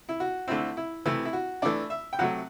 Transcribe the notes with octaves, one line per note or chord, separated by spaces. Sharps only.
E4
F#4
D3 A3 C4 E4
E4
C3 E3 A3 E4
E4
F#4
E3 A3 D4 D5
E5
G5
C3 F#3 A3 F#5